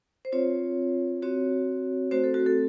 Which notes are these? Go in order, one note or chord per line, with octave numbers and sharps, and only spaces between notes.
C5
C4 F4 C#5
C4 F#4 C#5
A3 C4 F#4 C5
A4
F#4
A4